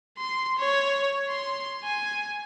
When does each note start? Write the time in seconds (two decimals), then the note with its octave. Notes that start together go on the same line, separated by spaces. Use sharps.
0.18 C6
0.58 C#5
1.28 C6
1.83 G#5